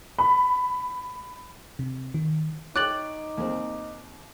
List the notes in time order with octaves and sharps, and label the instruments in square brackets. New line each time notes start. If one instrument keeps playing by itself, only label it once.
[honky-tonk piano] B5
[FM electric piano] C3
D#3
[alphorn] D#4 [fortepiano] C#5 G5 [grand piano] D6 [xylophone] F#6 A6 F#7
[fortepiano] D#2 C4